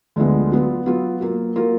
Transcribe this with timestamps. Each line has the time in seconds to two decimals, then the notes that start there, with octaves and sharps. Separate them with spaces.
0.16 D2 D3 F3 G#3 B3
0.52 F#3 B3 F4
0.86 F#3 B3 F4
1.21 F#3 A#3 F4 A#4
1.56 F#3 A#3 F4 A#4